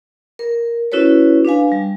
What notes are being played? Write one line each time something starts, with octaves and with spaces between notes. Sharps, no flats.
A#4
C#4 E4 F#4 A4 B4 C#5
D4 B4 F5 G#5
G3